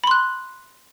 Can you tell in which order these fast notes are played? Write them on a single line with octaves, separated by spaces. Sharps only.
B5 C6 F#6